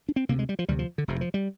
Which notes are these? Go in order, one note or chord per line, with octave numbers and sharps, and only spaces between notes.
D4
C4
D2 C3 A#3
G#3
G3
F3
D2 C3 G3
F3
D3
F1 F2 C3
F3
G3